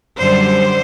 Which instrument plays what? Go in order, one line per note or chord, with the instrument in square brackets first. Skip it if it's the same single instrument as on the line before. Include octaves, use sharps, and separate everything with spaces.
[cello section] F#2 D3 G3 C5